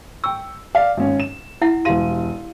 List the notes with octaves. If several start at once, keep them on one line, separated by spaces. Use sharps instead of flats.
G5 C#6 E6
D5 F5
G#1 C#4
E7
E4 E5 F#5
E1 G4 F5 C6 D#7